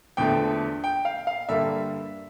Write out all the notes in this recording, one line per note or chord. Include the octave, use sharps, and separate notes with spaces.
E2 D3 F3 A3 G5
G5
F5
F5
G2 D3 G3 A#3 E5